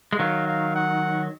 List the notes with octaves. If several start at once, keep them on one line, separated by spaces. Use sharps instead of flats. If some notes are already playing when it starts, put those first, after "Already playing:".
G#3
D#3 F#3 F5
F5
F#5